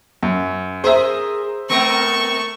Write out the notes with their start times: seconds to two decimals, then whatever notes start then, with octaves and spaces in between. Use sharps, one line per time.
0.23 F#2
0.84 G#4 A#4 C5 E5
1.70 A3 B3 C4 A#4 C#6